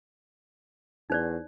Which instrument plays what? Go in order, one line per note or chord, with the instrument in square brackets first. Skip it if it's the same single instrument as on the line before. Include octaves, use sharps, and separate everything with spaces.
[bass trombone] E2 [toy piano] D#4 C5 D5